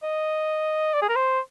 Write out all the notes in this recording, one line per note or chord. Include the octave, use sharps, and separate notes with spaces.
D#5
D5
G#4
A#4
C5